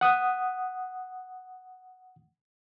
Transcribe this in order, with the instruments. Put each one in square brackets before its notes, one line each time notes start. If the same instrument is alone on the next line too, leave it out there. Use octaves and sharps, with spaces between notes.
[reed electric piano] F#5 D#6